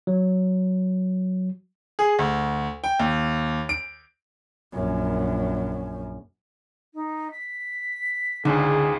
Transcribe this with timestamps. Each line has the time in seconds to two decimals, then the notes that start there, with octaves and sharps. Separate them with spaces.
0.07 F#3
1.99 G#4
2.19 D2
2.84 G5
3.00 D#2
3.69 D7
4.73 A#1 F#2
6.94 D#4
7.31 B6
8.45 C#2 G#2 D3 G#4 D5